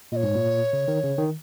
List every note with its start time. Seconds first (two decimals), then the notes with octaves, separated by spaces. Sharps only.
0.12 A#2 D#5
0.16 C#5
0.23 G#2
0.35 A#2
0.73 C#3
0.88 D#3
1.03 C#3
1.18 D#3